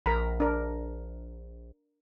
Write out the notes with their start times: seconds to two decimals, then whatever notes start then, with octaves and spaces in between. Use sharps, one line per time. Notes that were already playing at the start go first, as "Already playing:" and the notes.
0.06 A#1 A#4 A#5 B5
0.40 D4 A#4